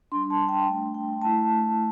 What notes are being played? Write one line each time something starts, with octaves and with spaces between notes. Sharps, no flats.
G3 D4 C6
A5
G5
A3 D4
G5
A3 E4 A5